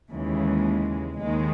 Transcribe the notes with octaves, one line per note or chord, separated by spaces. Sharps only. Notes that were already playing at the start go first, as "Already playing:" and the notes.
D#2 C#3 E3 G#3
D#2 D#3 G#3